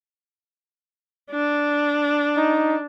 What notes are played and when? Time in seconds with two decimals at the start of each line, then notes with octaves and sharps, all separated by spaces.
1.31 D4
2.37 D#4